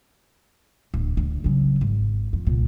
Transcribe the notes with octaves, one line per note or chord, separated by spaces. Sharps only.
D1
D2
C#3 F#3
G#1
F2
C2 A#2